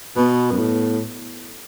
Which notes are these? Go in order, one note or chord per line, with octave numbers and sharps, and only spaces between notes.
B2 B3
F#2
A2